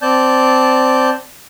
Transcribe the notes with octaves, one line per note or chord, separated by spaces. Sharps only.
C4 D5 A5 G6